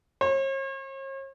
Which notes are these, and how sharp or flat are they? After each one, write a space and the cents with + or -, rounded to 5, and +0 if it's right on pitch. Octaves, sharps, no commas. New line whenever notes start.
C#5 -45